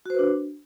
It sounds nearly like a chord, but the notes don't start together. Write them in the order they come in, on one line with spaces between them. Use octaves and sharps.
F#4 C5 B4 D4